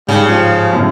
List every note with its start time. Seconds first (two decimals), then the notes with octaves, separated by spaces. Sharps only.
0.09 G#2 C#3 G3
0.28 F3 G4
0.73 F#2 A2 C#3